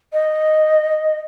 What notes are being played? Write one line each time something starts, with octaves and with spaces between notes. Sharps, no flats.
D#5